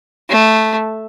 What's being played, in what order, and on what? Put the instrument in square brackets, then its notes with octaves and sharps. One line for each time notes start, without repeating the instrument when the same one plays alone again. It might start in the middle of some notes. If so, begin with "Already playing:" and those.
[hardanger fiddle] A3